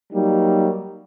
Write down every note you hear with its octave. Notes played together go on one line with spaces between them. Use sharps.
F#3 G3 A#3 D#4